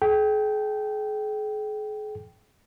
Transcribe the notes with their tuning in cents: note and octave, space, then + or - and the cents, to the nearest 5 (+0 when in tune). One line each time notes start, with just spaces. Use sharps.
G#4 +40 G5 -10